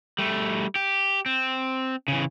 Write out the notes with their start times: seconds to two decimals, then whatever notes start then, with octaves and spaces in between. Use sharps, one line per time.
0.18 G3 A3
0.75 G4
1.26 C4
2.08 C#3 E3